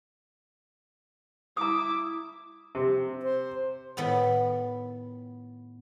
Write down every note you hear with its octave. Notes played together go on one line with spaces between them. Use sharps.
E4 A#5 D6 D#6
C3
C5
A2 D#3 B3 A4